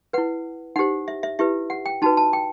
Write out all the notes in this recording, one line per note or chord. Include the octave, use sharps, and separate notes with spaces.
E4 B4 F#5
D#4 G4 C5 F#5
E5
E5
E4 G4 B4 E5
F#5
G5
D#4 F#4 B4 A5
A5
G5